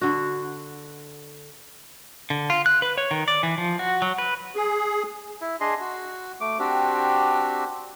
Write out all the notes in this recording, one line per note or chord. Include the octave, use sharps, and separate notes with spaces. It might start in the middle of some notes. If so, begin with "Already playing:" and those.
D3 F#4
D3
F4
F#6
B4
C#5
D#3
D5
E3
F3
F#4
F#3
B4
G#4
E4
D4 G#4 D#5 C6
F#4
A3 D6
C4 D4 F#4 G4